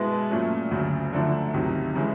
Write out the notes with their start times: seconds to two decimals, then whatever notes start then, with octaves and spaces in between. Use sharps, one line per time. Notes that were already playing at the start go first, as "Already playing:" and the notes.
Already playing: B2 G#3 B3 E4
0.30 A#2 F#3 A3 C#4
0.71 D2 C#3 F#3
1.13 F#2 D3 F3 A3 D4
1.54 C#2 C3 D#3 F#3
1.96 C#3 E3 G#3